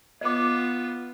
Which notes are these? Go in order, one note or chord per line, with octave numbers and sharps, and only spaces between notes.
B3 F4 D#5 D6